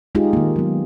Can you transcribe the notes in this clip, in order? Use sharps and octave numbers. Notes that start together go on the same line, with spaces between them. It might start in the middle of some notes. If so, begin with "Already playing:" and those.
G#3 D#4 F4 G4 G#4
D#3 A#3
F#3 B3